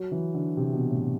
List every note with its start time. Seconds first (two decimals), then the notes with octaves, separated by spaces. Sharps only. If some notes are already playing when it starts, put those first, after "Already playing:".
Already playing: F#3
0.12 E3
0.34 D3
0.57 C3
0.73 B2
0.90 A2